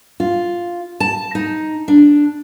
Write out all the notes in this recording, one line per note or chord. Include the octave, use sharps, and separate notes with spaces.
F4
A5
D#4
D4